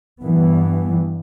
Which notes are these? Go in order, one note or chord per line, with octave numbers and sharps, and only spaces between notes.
G2 E3 B3